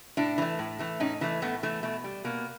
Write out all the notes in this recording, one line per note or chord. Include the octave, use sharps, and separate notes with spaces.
A2 D4 E4
E3 A3
A2
E3 A3
A2 C#4 D#4
E3 A3
A2 A3 B3
E3 A3
B2 A3
G3
B2 A#3